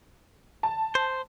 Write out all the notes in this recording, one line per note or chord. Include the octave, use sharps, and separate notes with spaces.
A5
C5